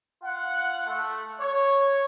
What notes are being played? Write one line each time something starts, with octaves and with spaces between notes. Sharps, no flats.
F4 F#5
A3
C#5